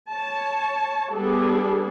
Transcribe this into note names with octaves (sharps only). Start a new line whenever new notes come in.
C#5 A5
G3 B3 D4 G#4 A4